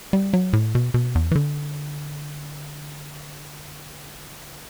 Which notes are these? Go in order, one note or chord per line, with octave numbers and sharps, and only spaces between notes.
G3
F#3
A2
B2
B2
E2
E3
D3